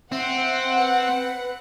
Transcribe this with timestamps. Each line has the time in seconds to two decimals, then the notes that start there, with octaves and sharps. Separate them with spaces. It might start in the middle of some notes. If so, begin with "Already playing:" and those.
0.12 C4 E5 F#5
0.77 B4